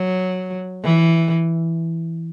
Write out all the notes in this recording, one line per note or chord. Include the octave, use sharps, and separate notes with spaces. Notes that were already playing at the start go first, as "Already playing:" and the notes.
Already playing: F#3
E3